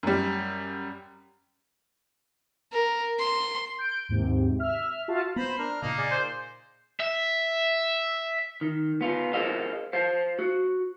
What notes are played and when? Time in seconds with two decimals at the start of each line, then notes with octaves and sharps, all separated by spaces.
0.03 F#2 G3
2.72 A#4
3.19 C6
3.78 G6 D7
4.09 D#2 G#2 C3
4.59 E5 F6
5.08 F4 F#4 E5 F5 A5
5.36 B3 C5 A#5 B5
5.58 D4 A#4
5.82 A#2 C#3 A#3 D#4 D#5 F6
5.98 G#4 D5
6.11 C5
7.00 E5
8.61 D#3
9.01 B3 F4
9.33 G#4 A#4 C5 D#5 F5
9.93 C5 F5
10.39 F#4